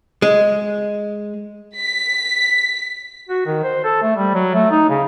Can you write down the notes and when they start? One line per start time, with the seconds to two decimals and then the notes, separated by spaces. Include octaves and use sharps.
0.22 G#3
1.77 B6
3.29 F#4
3.46 D#3
3.64 C5
3.84 A4
4.02 A3
4.16 G3
4.35 F#3
4.54 A3
4.71 D#4
4.89 C#3